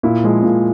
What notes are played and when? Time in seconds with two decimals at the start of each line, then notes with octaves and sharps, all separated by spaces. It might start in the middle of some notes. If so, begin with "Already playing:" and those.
0.03 A#2 E4
0.23 F3 G#3
0.43 A#2